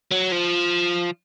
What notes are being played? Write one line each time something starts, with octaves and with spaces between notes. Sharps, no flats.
F#3
F3